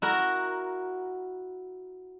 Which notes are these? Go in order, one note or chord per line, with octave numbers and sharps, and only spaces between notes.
E4 F#4 A#4